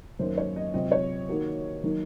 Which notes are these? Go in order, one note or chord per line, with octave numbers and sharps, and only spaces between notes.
F#2 D#3 A#3 C5
C#5
D#5
C3 F#3 C4 F4 D#5
C#5
D#3 A#3 D#4 F#4 A#4
D#3 F#3 A#3 D#4 A#4